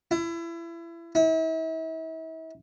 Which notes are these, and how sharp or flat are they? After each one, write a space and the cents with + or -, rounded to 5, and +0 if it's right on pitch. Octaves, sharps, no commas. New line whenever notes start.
E4 +30
E4 -40